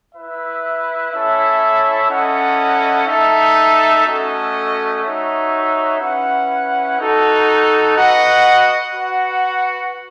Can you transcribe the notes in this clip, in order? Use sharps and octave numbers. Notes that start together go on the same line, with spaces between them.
E4 B4 E5
C#4 E4 A4 C#5 E5
C#4 E4 A4 D#5 F#5
D#4 A4 E5
A3 C#4 F#4 A4 D#5
D#4 F#4 C#5 E5
C#4 E4 B4 F#5
D#4 F#4 A4
F#4 B4 D#5 F#5
F#4 B4 F#5